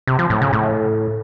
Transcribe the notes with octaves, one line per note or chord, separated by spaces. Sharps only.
C3
F3
A2
C#3
A2